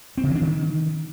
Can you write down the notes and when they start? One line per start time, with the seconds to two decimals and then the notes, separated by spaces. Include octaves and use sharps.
0.18 C4
0.24 C#3
0.30 E3
0.36 D4
0.41 D#3